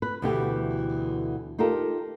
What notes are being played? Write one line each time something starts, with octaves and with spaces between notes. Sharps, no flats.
B4
D2 B2 E3 A3 G4 B4
D#4 F4 G4 A4 A#4